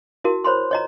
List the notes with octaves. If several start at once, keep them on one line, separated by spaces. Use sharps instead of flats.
E4 F#4 A#4
C5 C#5 B5 C6
C#5 D#5 A#5